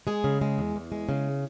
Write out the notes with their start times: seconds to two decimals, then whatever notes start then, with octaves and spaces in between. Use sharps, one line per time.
0.07 G#3 G#4
0.24 C#3
0.41 G#3
0.58 E2
0.76 E2
0.92 G#3
1.09 C#3